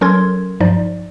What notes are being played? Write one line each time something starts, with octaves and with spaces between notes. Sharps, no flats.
F#3 C#4 A4 A#4 C6 G#6
G2 F3 D#4 D5